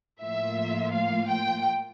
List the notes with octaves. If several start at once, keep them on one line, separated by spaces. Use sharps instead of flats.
A2 F3 A#3 F4 E5
F5
G5